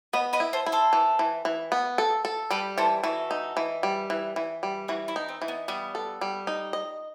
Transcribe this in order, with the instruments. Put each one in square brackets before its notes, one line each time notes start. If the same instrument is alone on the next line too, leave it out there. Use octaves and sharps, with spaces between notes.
[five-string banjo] B3 [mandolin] B4 D#5
[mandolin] B4 D#5
[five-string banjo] E4
[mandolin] A4 C5
[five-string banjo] E4
[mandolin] A4 C5
[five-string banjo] E3
E3
E3
B3
A4
A4
[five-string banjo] G3 [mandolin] G4 B4
[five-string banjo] E3 [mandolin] A4 C5
[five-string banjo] E3 [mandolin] F#4 A4
[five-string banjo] D#4
E3
G3
E3
E3
G3
[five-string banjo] E3 [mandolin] F#4
[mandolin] E4
[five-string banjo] D#4
[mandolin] C4
[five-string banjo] E3
[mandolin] B3
[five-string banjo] G3 [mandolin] B3
[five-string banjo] A4
G3
D#4
D#5